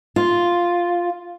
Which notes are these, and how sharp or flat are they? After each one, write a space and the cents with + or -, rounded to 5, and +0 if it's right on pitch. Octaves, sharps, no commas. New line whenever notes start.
F4 +0